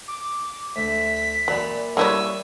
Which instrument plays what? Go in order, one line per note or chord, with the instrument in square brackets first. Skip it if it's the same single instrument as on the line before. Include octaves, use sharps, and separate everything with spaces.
[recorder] D6
[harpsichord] D2 [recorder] E5 [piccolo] B6
[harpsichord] A#2 D5 B5 [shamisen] F#3
[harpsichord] G3 C#6 D#6 [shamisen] A#3 E4 C#5 [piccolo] E6